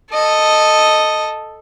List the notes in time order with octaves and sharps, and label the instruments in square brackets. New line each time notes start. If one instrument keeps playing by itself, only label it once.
[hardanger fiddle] A4 D#5